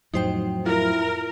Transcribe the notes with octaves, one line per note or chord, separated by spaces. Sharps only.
F2 A2 F#3 D#4 C5 G5
E4 F4 A#4